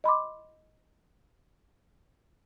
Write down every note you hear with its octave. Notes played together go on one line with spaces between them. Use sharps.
D#5 B5 C6 D6